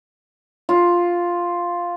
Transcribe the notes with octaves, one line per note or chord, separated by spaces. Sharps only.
F4